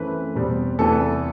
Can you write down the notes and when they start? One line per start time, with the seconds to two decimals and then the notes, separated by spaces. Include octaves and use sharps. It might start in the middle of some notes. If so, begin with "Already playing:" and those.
Already playing: F#2 E3 A3 C4 B4
0.35 E2 B2 G3 C4
0.78 E2 C3 E3 B3 A4